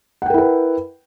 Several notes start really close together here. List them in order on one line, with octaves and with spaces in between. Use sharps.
F#5 G5 A#4 E4 B4